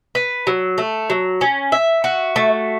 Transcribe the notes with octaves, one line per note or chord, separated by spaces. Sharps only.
B4
F#3
A3
F#3
C#4
E5
F#4
A3